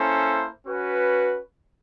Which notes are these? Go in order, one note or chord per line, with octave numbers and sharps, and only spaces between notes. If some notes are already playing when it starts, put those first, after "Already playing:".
Already playing: A#3 C#4 E4 A4 C5
C#4 F#4 B4